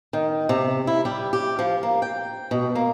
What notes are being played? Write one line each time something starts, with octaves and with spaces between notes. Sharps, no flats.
D#3
C3
E4
G3
G4
F3
A#3
G5
B2
A#3